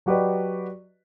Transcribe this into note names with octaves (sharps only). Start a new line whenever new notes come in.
F#3 F#4 G4 B4 D5 D#5